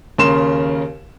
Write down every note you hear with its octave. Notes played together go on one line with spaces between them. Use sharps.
D#2 C#3 A#4 C6 E7